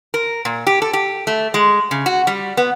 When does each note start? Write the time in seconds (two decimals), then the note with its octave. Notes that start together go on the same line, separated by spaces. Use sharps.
0.14 A#4
0.45 A#2
0.67 G4
0.82 A4
0.93 G4
1.27 A3
1.54 G#3
1.91 C#3
2.06 F#4
2.27 G3
2.57 B3